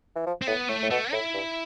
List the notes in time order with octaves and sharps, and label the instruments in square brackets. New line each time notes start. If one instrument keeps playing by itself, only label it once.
[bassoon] E3
F3
[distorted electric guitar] C4
[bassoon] A2 [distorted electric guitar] B3
[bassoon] A2 [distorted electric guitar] A3
[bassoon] A2
[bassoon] B2 [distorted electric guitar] A3
[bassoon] A2 [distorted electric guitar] E4
[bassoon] G2